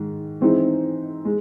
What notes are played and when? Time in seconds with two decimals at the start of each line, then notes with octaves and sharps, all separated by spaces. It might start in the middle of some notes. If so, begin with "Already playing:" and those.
Already playing: G#2 D#3
0.41 E3 G#3 C4 D#4
1.25 G#3